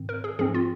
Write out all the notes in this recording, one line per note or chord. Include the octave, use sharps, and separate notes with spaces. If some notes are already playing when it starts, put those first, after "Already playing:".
Already playing: G#2 D#3 C4
A#4
G#4
G#2 F3 C4 G#4
F4